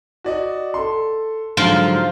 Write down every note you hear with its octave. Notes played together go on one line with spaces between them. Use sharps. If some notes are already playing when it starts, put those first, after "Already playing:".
F#4 D5 D#5
A4 C6
G#2 D3 F3 F#3 F4